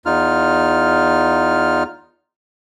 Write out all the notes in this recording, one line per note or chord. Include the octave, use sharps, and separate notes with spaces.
E2 D#4 F4 F6